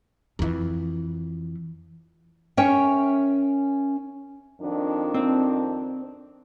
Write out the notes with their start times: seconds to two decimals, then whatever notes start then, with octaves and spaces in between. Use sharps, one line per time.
0.39 F2 E3
2.57 C#4 A#4 C#5 E5 G5
4.61 F2 D#3 D4
5.14 C4